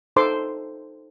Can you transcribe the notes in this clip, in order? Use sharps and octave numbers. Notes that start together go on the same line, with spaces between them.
D#4 A4 C5 C6 D6